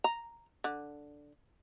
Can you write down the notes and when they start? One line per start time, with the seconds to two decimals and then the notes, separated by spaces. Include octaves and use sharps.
0.04 A#5
0.64 D3